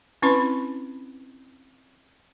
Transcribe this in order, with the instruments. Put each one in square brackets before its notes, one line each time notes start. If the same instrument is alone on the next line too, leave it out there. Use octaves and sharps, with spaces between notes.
[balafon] C4 C#4 E4 B4 B5 C6